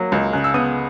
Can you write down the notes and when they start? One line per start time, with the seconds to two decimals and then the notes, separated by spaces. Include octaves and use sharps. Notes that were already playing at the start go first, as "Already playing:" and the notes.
Already playing: F#3 A#3
0.12 C#2
0.33 C#3 F#6
0.44 E6
0.54 B3 D#6